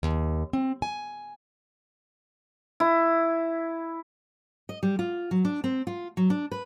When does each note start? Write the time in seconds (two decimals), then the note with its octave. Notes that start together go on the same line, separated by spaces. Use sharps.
0.03 D#2
0.53 C4
0.82 G#5
2.80 E4
4.69 D#5
4.83 G3
4.99 F4
5.31 F#3
5.45 D4
5.64 C4
5.87 F4
6.17 F#3
6.30 D4
6.52 B4